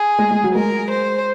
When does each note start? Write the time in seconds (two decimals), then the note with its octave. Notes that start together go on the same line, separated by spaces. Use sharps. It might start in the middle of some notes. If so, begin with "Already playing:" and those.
Already playing: G#4
0.19 G#3
0.31 G#3
0.43 F#3
0.55 G#3 A#4
0.91 C5